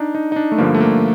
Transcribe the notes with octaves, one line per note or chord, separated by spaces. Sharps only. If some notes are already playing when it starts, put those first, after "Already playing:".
Already playing: D4 D#4
D#4
D#4
D4
A3
G2 D3 F3 A#3
A3
A#3